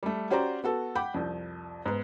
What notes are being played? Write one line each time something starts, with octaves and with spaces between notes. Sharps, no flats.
G3 A3
C#4 F#4 G4 C5 D5 A#5
B3 F#4 A4
F#5 G5 B5 D6 G6
C2 F2
G#2 B3